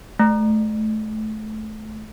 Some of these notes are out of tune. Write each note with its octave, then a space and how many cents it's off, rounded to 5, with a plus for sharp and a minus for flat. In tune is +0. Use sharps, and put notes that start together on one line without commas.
A3 -25